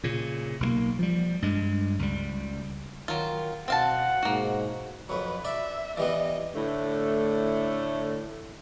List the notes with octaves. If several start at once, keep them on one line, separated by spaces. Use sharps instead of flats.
A#2 C#3
B1 D#3 A#3
F3 G3
G2 G#3
C#2 G3
D#3 F#3 F4
B2 C4 F5 F#5 A5
G#2 B2 A#3 F#4
F2 F#3 B4
D4 D5 E5 B5
E3 G3 B3 D#5
A2 D3 A3